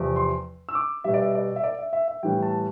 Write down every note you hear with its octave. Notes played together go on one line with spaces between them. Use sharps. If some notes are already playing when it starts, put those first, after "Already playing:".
Already playing: E2 C3 F3
C6
E6
D6
B2 G3 E5
D5
E5
D5
E5
D5
E5
E5
E5
A2 E3 G3 G5
A5